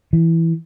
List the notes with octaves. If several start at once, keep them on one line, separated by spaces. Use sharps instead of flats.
E3